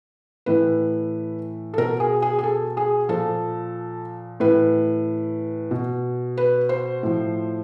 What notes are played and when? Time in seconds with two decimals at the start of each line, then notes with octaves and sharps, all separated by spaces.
0.46 A2 E3 B4
1.74 A4
1.78 B2 A#4
2.00 G#4
2.22 G#4
2.39 G#4
2.43 A4
2.77 G#4
3.09 A#2 F3 A4
4.40 A2 E3 B4
5.71 B2
6.37 B4
6.69 C5
7.03 A2 F3